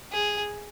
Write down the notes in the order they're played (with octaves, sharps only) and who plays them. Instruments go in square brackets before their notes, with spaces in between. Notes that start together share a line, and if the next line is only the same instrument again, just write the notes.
[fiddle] G#4